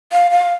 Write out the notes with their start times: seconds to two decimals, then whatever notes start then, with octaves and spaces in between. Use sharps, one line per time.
0.12 F5
0.31 F5